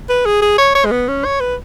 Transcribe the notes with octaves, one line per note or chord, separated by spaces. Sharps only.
B4
G#4
G#4
C#5
C#5
G#3
B3
C#4
C#5
B4